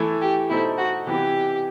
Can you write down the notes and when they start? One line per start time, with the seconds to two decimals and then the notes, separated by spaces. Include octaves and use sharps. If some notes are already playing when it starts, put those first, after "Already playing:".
Already playing: E3 A3 E4 A4
0.21 G4
0.49 B2 A3 D#4 E4 A4 C5
0.78 F#4
1.06 C3 E3 B3 E4 G4